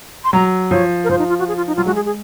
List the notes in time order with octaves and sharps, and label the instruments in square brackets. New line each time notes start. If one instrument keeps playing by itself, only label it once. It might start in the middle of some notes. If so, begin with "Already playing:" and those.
[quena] C6
[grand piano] F#3 [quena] A#5
[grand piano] F3 [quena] C#5
[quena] A#4
[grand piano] F3 [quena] C5
[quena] D#4
F4
F#4
G#4
F4
D#4
[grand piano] F#3 [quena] F4
[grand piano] G#3 [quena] F#4
[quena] G#4
G#4